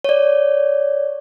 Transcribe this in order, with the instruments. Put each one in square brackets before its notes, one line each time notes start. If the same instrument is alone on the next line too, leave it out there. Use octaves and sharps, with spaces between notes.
[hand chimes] C#5 D5